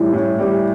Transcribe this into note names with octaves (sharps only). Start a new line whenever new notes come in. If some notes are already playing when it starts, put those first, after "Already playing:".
Already playing: A2 E3 G3
A2
E3 G3